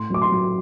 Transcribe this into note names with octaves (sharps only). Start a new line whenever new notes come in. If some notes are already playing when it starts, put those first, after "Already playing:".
Already playing: A2 C6
F#3 D6
C6
F#3